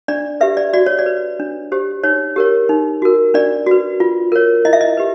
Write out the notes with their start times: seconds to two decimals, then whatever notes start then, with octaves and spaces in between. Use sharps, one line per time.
0.08 D4 D5
0.41 G4 B4 E5
0.57 D5
0.73 F#4 D5
0.86 C#5
0.99 D5
1.06 B4
1.40 D4
1.72 G4 C5
2.04 D#4 C#5
2.36 G4 A#4 C#5
2.69 D#4
3.02 F#4 A#4
3.34 D4 D5
3.66 F#4 B4
4.00 F4
4.32 A#4 C#5
4.65 E4 D#5
4.73 E5
4.81 D#5
4.97 G4 B4